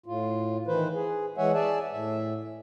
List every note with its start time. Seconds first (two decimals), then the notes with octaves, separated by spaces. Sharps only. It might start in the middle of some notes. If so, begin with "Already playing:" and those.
0.06 A2 F4
0.67 D#3 E3 B4 C5
0.94 G#4
1.38 E3 G#3 C#5 E5 F#5 G#5
1.54 G#4 D5 E5 G#5 A5
1.93 A2 E5